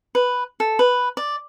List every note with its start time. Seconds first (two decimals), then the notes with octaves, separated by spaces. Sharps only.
0.15 B4
0.60 A4
0.79 B4
1.17 D5